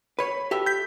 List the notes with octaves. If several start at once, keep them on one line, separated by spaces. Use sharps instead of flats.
B4 C#5 B5
G4 A4 E5
G6 B6